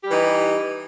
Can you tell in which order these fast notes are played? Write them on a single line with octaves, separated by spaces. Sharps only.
G4 G3 E3 D#4